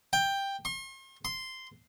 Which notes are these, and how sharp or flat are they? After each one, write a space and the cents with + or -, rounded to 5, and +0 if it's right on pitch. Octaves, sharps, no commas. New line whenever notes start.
G5 +10
C6 +45
C6 -5